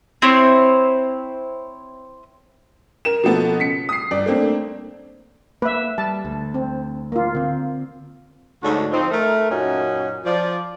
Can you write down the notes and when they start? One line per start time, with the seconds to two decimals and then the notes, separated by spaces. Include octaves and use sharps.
0.22 C4 E4 C5 C#5
3.05 A#4 E7
3.23 B2 F3 A#3 B3 A4
3.59 C#3 B6 C#7
3.89 D#6 C7
4.11 G1 D5
4.26 A3 A#3 C4 D4
5.62 A#3 B4 E5
5.98 G3 A5
6.25 D2
6.54 C4
7.12 A#3 F4
7.35 D3 C4
8.63 D2 G#2 D4 F#4 A4 C#5
8.92 F3 C4 D#4
9.11 A3 A#4
9.50 F#2 A#2 C#4 D#4 F#4
10.25 F3 D5